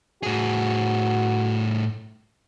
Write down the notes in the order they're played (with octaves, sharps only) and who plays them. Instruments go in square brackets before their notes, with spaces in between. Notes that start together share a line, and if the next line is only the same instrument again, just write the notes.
[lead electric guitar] A2 G#4 [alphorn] F#4